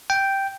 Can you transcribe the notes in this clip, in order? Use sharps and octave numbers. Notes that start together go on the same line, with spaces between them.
G5